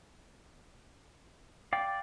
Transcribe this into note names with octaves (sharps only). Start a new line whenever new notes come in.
D5 F5 G5